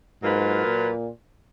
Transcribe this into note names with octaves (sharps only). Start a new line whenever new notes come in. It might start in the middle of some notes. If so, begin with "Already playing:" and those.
G#2 F#3 A#3 F4 B4
A#2